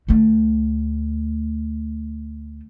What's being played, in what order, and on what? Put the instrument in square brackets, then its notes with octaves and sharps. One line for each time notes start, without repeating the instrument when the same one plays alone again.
[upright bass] D2 A3